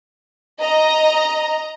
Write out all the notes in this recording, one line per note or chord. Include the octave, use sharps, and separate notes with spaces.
D#5 A#5